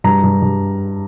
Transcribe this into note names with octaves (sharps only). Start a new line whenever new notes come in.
G2 A#5
G2
G2